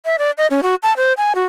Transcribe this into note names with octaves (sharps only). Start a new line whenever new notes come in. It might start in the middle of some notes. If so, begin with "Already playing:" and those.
E5
D5
D#5
C#4
F#4
A5
C5
G#5
F#4